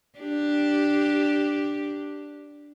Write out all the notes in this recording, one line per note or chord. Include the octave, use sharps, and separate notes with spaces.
D4 G4